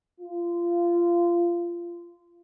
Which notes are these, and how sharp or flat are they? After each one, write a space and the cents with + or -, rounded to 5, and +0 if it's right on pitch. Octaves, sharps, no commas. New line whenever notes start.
F4 -20